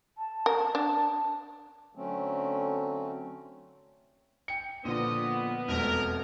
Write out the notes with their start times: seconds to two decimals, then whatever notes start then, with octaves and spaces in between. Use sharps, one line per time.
0.18 A5
0.46 A#4
0.75 D4
1.95 D3 F#3 A3 C4 C#4
4.48 G5 C#7
4.85 A#2 D3 F3 B3 G4 D#5
5.68 E1 F2 A3 A#4